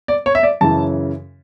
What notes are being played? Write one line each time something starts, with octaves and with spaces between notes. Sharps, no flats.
D5
C#5
E5
D5
F#2 C#3 E3 A5